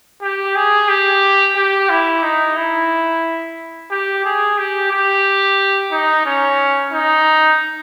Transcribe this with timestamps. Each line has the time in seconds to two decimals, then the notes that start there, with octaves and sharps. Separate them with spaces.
0.22 G4
0.55 G#4
0.89 G4
1.56 G4
1.89 E4
2.23 D#4
2.56 E4
3.91 G4
4.25 G#4
4.58 G4
4.91 G4
5.91 D#4
6.26 C#4
6.93 D#4